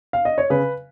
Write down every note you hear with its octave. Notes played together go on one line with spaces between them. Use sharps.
F5
D#5
C#5
C#3 B4